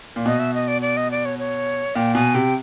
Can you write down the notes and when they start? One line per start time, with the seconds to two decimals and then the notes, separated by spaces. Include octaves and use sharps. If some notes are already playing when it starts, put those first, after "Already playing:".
0.16 A#2
0.26 B2 D#5
0.39 E5
0.54 D#5
0.68 D5
0.82 D5
0.97 D#5
1.11 D5
1.25 C#5
1.39 C#5
1.96 A#2 G5
2.15 B2 G#5
2.34 C3 G5